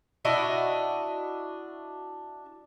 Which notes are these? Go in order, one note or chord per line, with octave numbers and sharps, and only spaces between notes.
D4 E4 F#4 D#5